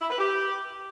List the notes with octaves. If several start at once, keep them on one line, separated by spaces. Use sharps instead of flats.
E4
B4
G4